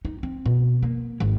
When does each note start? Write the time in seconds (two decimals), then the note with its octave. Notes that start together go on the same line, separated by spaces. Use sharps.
0.05 D#4
0.23 C4
0.46 B2
0.83 A#3
1.20 G#1